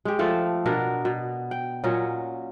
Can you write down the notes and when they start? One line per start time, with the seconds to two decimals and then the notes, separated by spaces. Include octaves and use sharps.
0.05 G#3 G4
0.19 F3 A3 A4
0.66 B2 B3 D4 A#4
1.05 B2
1.51 G5
1.84 A#2 F#3 C#4 D#5